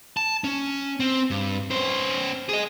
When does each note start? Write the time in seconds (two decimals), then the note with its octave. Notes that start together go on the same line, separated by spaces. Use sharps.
0.17 A5
0.44 C#4
1.00 C4
1.31 G2
1.71 C#4 C5
2.49 G#4 D#5